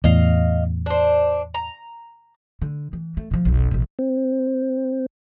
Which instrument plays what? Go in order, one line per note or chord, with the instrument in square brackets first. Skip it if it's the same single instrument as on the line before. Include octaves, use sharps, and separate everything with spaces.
[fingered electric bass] E2 A2 [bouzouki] D#5 F5
[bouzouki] D4 C5
A#5
[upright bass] D3
E3
A3
C3 F3
F1 B1
A1 B2
[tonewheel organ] C4